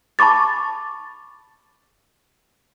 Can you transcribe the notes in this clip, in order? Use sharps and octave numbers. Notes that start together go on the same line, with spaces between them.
A5 B5 C#6 D6 A6